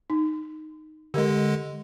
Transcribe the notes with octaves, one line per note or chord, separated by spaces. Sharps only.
D#4
D3 G#3 G4 A#4 D#5